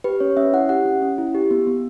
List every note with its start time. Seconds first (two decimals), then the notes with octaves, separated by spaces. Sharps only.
0.04 G4 B4
0.20 C#4 C#5
0.37 C#4 E5
0.53 E4 F#5
0.69 G4 F#5
0.86 C#4
1.02 C#4
1.18 E4
1.35 G4
1.51 B3
1.67 B3